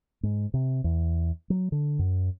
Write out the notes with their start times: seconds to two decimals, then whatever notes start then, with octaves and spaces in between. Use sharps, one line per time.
0.23 G#2
0.54 C3
0.84 E2
1.50 F#3
1.72 D3
1.99 F#2